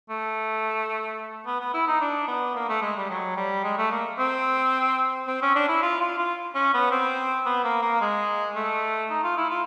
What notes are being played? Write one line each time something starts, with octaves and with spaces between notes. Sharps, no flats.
A3
B3
B3
E4
D#4
D4
B3
A#3
A3
G#3
G3
F#3
G3
G#3
A3
A#3
C4
C4
C#4
D4
E4
F4
F4
F4
C#4
B3
C4
B3
A#3
A#3
G#3
A3
D#4
F4
E4
F4